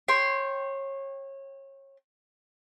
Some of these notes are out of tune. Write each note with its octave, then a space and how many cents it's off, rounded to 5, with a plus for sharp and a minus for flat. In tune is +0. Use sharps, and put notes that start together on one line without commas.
C#5 -25 G5 +0 C6 +0